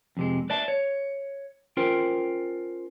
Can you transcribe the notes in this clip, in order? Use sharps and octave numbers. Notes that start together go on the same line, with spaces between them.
F2 C3 G#3
B4 D5 E5 A5
C#5
C#4 F4 A#4 C5 G5